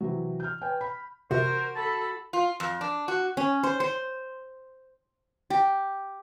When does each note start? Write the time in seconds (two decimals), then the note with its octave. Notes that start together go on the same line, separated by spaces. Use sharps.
0.01 C3 E3 F#3
0.40 F6 G6
0.62 B4 C#5 G5 G#5
0.81 B5
1.31 C3 F#4 A#4 C5
1.76 A4 A5 B5
2.33 F4
2.60 F2
2.81 D4
3.08 F#4
3.37 C#4
3.63 C5
3.80 C5
5.50 G4